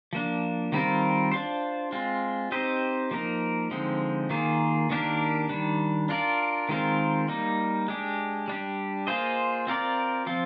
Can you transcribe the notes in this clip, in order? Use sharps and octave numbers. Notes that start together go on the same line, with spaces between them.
F3 A#3 D4
D#3 G3 C4 F4 A#4
D4 F4 C5
G#3 C4 F4
C4 D#4 G4 C5 D#5
F3 A#3 D#4 A#4
D3 F3 G#3 C4 D#4
D#3 A#3 F4 G#4
D#3 A#3 D4 G4 A#4
D#3 G3 D4
D4 F4 A#4 D5
D#3 G#3 C4 F4 A#4
G3 A#3 D#4
G#3 D4 G4
G3 D4 G4
A#3 F4 G#4 C5 D#5
C4 F4 A#4 D5
F3 C4 F4